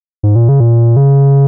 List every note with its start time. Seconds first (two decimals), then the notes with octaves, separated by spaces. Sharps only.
0.23 G#2
0.36 A#2
0.49 C#3
0.60 A#2
0.96 C#3